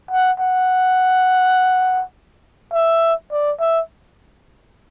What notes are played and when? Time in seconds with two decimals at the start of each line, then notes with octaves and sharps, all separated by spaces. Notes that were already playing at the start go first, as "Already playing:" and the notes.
0.11 F#5
0.40 F#5
2.73 E5
3.31 D5
3.60 E5